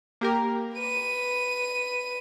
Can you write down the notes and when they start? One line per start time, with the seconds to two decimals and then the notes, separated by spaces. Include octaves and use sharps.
0.21 A#3 G4 A#4
0.75 B4 D#7